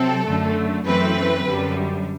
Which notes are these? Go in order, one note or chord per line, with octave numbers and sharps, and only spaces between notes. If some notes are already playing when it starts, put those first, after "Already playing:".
Already playing: C3 F#3 C4 A4
F#2 D3 A3
F#2 E3 A3 C4 B4
F#2 D3 G3